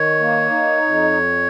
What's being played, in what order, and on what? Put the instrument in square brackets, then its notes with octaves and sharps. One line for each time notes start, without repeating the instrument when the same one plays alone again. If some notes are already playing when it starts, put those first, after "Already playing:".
Already playing: [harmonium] D#3 [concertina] C#5
[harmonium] A#3
D#4
F2